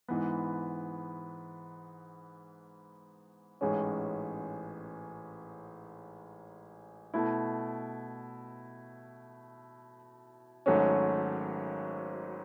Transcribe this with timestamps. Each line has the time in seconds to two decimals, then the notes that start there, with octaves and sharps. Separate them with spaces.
0.08 G#2 E3 B3
3.61 A1 G#2 G#3 C#4
7.14 B2 A3 E4
10.66 G#1 G#2 F#3 A3 C#4